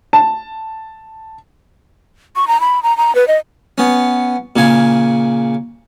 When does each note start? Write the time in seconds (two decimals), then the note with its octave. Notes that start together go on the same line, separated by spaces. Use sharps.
0.13 A5
2.36 C#6
2.48 A#5
2.61 B5
2.83 A#5
2.97 A#5
3.15 B4
3.28 D#5
3.78 B3 C#4
4.56 A#2 C#3 G#5